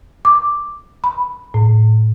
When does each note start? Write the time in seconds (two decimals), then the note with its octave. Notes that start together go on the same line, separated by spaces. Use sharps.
0.25 D6
1.04 B5
1.54 A2